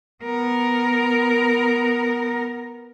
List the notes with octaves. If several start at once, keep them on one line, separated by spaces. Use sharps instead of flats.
B3 A#4